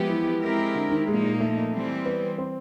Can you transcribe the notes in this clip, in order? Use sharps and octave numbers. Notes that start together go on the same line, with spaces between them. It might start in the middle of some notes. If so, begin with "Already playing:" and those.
Already playing: F3 G#3 B3 E4 G4
E3
G#3 C4 E4 G4 A#4
D3
D#3
A#2 F3 G#3 A#3 D#4
A3
E3 G3 C4
B3
C4